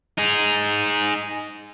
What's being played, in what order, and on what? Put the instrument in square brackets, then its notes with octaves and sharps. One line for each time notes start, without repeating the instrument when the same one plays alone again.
[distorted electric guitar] D#4 G#4